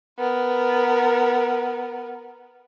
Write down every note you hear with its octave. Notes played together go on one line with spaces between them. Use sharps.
B3 A#4